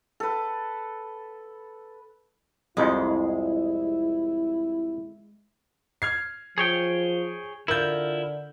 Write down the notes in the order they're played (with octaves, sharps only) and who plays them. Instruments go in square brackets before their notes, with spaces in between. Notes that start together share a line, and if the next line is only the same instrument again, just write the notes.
[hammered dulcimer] A4 B4
[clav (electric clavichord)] C2 F2 [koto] G#3 [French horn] E4
[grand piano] F6 G#6 C7
[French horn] F3 [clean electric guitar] G#4 C#5 G5
[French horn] D3 [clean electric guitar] E4 F4 [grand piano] A#4 G6